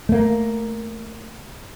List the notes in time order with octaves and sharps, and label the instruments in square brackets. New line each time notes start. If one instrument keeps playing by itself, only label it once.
[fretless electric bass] A3 A#3